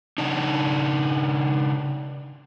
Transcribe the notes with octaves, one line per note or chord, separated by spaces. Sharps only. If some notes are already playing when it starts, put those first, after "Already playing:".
C#3 D4 D#4